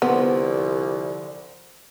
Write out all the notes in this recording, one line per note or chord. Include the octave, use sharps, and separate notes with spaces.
C2 D3 F3 B3